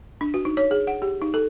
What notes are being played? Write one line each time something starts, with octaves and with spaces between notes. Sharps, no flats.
D4
F#4
D#4
C#5
G#4
F#5
G4
D#4
A4